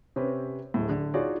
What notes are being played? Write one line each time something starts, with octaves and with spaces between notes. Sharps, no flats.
C3 C4 C#4 B4
D1 A2
D3
D#4 F4 F#4 G#4 C#5 D5